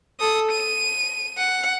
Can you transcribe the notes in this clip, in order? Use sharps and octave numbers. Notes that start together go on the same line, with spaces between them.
A4 D#6
D#7
F#5